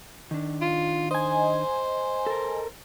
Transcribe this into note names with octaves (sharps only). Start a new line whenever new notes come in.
D#3 D4
F4
C5 D#5 G#5
A4 A#4